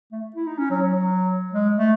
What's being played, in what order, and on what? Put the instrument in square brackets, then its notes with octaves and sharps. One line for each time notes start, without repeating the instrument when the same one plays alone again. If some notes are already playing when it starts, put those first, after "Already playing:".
[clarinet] A3
E4
D#4
C#4
F#3
F#3
F#3
G#3
A3